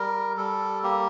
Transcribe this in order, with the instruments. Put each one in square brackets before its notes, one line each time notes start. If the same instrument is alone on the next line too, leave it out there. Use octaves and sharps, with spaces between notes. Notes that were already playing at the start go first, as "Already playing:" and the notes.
Already playing: [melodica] G3 A#4
G3 A4
A#3 G4